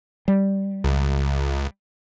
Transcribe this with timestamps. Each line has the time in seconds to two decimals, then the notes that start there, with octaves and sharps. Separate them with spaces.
0.28 G3
0.84 C#2